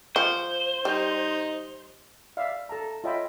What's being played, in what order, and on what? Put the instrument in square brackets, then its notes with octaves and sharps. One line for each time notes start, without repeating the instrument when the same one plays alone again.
[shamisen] F3 [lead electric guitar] C5
[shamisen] G3 [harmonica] D#4
[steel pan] D5 E5 F5
A4 A5 A#5
F4 C#5 D#5 E5 G5 B5